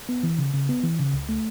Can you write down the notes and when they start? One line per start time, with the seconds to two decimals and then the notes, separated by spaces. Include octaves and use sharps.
0.09 B3
0.23 E3
0.39 C#3
0.54 C#3
0.69 B3
0.84 E3
0.99 C#3
1.14 C#2
1.29 A3